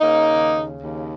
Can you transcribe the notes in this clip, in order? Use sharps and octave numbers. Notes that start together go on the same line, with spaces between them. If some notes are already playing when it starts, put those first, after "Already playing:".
C#3 A#3 D#4
D#2
C#3
D#2